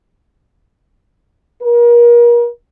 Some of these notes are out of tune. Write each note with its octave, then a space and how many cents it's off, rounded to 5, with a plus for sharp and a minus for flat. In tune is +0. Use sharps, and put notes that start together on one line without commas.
A#4 +35